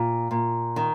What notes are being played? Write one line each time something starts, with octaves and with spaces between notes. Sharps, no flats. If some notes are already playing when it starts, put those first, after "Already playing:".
Already playing: A#2
A#2
D#3